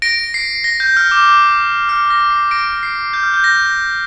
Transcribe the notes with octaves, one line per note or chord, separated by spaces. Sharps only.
A#6 D7
C7
A#6
G6
F6
D6
F6
A#6
C7
A#6 D7
C7
G6
F6
G6
A#6